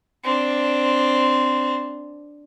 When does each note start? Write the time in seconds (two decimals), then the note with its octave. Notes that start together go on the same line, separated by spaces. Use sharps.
0.24 C4 D4